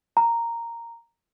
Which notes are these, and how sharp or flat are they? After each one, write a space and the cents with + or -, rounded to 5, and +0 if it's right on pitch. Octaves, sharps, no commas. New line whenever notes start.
A#5 -5